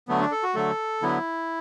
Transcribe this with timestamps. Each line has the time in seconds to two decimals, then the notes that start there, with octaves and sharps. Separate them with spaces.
0.08 D3 F#3 A3 B3
0.20 D4
0.32 A4
0.43 F#4
0.55 D3 F#3 A3 A4
1.02 D3 F#3 B3 E4